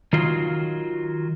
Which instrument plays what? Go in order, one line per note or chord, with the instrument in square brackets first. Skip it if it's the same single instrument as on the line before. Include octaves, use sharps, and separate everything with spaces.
[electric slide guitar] D#3 F#3 F4